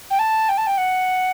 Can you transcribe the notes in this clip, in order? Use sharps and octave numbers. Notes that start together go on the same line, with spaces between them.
G5
A5
G5
A5
G5
F#5